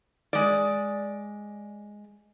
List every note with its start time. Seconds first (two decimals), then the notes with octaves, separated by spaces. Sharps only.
0.33 G#3 D5